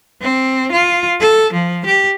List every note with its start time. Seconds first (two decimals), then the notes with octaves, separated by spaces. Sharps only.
0.21 C4
0.72 F4
1.20 A4
1.52 F3
1.85 G4